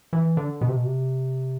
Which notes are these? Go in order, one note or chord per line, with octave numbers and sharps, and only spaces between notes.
E3
D3
B2
C3
B2
C3